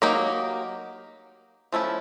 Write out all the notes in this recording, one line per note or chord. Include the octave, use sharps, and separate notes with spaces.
F#3 A#3 D#4 G4 A#4
F3 A3 C#4 E4